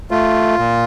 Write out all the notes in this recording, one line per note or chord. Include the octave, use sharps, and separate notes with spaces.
A3 F4
A#2